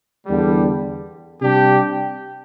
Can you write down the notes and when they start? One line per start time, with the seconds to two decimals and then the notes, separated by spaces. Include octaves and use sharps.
0.27 E2 D3 G3
1.41 C3 G3 D4 G4